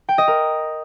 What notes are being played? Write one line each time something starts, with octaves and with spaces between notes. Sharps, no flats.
G5
D#5
A#4